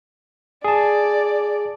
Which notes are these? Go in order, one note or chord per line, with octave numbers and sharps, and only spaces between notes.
G#4 D5 A5